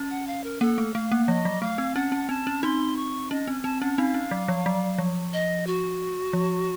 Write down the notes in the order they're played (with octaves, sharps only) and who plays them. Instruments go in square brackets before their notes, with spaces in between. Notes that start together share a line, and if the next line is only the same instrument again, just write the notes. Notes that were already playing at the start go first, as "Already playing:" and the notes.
Already playing: [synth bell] C#4
[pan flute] F#5
F5
A#4
[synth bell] A#3 [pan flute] A4
[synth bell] A3
[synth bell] A3 [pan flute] F5
[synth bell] A#3
[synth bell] F3 [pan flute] D#5
[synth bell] F#3
[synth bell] A3 [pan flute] F5
[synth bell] C4
[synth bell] C#4 [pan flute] F#5
[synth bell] C#4
[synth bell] C4 [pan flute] A5
[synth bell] C#4
[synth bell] C4 D#4 [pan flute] C6
[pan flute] C#6
[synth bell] C#4 [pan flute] D#5
[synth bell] C4
[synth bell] C4 [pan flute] A5
[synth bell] C#4 [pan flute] F#5
[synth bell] C4 D#4 [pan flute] F5
[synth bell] C#4
F#3
F3
F#3
F3
[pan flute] D#5
F#4
[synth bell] F3